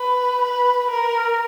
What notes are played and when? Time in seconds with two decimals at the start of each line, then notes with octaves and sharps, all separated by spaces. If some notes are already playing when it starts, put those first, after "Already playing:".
Already playing: B4
0.41 B4
0.90 A#4